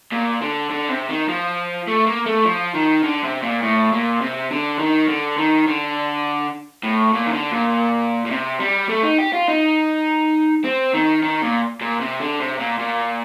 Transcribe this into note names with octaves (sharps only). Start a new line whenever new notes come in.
A#2
D3
D3
C3
D#3
F3
A3
A#3
A3
F3
D#3
D3
C3
A#2
A2
A#2
C3
D3
D#3
D3
D#3
D3
A2
A#2
D#3
D3
A#2
A#2
C3
G3
A3
D#4
G4
F4
D#4
C4
D#3
D#3
A#2
A#2
C3
D3
C3
A#2
A#2